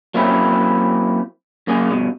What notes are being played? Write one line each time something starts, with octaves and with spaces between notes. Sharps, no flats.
F#3 A#3 C4 C#4 E4
F#2 A#3 G#4
G2 B2